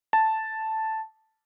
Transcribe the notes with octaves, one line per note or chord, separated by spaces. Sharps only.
A5